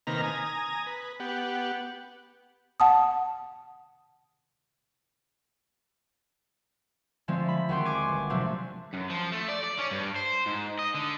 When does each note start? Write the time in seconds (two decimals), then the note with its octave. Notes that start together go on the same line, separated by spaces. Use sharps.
0.07 C3 D#3 A#3 B4 A#5 F6
0.23 G#5 A#5 D#6
0.86 B4
1.20 B3 G4 F#5
2.80 F#5 A5 D#6
7.28 D3 F3 G#3 A3 C4
7.48 B5
7.69 D#2 F#4 F#5 G5 C6
7.85 G#5 C#6 D6
8.08 G1
8.30 C3 F3 F#3 A3 C4 D4
8.94 F#2
9.10 F3
9.32 A3
9.48 D5
9.64 D5
9.78 C#4
9.91 G2
10.16 C5
10.46 G#2
10.79 D#5
10.94 D3